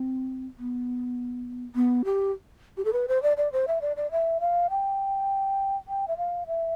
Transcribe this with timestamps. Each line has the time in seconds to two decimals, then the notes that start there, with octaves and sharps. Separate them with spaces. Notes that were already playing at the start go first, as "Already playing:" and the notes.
Already playing: C4
0.58 B3
1.75 B3
2.05 G4
2.77 G4
2.85 A4
2.93 B4
3.08 C5
3.23 D5
3.37 D5
3.52 C5
3.68 E5
3.82 D5
3.97 D5
4.11 E5
4.41 F5
4.70 G5
5.88 G5
6.08 E5
6.17 F5
6.47 E5